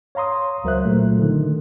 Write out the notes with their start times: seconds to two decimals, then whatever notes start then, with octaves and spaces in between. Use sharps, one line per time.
0.15 C#5 F5 A#5 C6 D#6
0.64 C#2 F#3 A#4 C5 E5 F#6
0.85 A#2 F#3 A3
1.19 D3 D#3